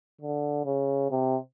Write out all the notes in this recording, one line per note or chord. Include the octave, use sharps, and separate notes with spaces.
D3
C#3
C3